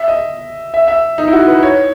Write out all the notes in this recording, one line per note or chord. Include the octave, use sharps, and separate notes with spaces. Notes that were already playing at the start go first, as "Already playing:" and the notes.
Already playing: E5
D#5
E5
E5
D#4
E4
F#4
B4
C#5